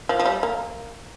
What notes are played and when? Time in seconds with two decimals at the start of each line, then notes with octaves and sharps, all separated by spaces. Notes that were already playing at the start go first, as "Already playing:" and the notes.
0.09 F3
0.19 F3
0.25 G3
0.43 A#3